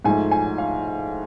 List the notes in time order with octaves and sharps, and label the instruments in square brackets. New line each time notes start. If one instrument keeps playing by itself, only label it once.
[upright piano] G#2 F3 A3 G#5
G#5
F5